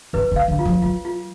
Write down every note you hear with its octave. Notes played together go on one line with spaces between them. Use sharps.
C#3 B4
C#3
F5
D3
F4
F3
F#3 F4
F4